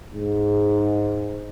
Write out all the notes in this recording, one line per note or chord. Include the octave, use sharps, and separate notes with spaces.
G#2